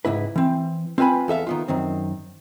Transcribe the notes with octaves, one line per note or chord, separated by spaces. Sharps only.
C#2 G#2 E4 B4
E3 C4
C4 F4 B4 G#5 B5
E2 A4 E5 F5
D#3 B3 F4
F#2 D#3 C4